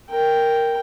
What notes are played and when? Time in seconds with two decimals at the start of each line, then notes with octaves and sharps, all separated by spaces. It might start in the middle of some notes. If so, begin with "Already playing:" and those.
0.10 A#4 G5